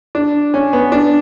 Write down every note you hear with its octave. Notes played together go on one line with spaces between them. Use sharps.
D4
C#4
B3
D4